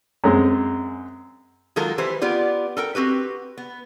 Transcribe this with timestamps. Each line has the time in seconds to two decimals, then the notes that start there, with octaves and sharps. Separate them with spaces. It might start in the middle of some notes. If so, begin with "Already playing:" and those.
0.24 F#2 G#3 C4
1.76 D#3 F#3 G#3 F4 A4 A#4
1.98 E3 G4 B4 C5
2.21 B3 F4 G4 D5
2.77 A4 A#4 G5
2.95 C4 F#4 G4 B4
3.58 B3